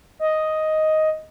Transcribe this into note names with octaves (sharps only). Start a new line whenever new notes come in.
D#5